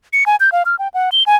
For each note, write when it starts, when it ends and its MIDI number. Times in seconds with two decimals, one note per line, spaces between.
0.13 0.24 97
0.26 0.36 80
0.40 0.50 91
0.52 0.63 77
0.66 0.76 89
0.79 0.88 79
0.94 1.10 78
1.12 1.23 103
1.26 1.36 80